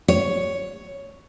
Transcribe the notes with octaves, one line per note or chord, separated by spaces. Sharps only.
C#5